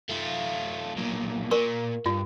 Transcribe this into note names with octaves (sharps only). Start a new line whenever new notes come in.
A3 F4
B1 A#2
A#2 A#4 C#6
G2 F4